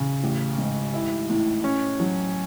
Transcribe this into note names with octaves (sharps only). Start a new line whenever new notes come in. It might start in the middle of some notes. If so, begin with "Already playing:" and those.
Already playing: C#3
A1
G#2
E4
A2
C#4
F#3